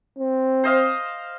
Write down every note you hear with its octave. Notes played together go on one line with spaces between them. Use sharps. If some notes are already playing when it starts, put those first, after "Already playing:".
C4
C5 D#5 F5